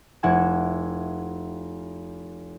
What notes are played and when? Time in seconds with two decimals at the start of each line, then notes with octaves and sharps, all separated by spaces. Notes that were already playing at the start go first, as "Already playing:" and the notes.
0.23 F1 E4 F#5 G#5 E6